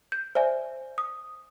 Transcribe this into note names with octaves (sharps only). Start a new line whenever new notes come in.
G6
C5 D5 E5 G#5
D#6